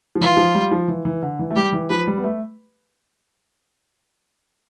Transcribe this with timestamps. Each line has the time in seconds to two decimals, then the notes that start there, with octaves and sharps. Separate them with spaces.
0.15 F3
0.21 E3 F4
0.37 F3
0.55 G3
0.72 F3
0.88 E3
1.05 E3
1.22 D3
1.39 E3
1.51 A3
1.56 G3 G4
1.73 E3
1.90 F3 B4
2.07 G3
2.18 B3
2.24 A3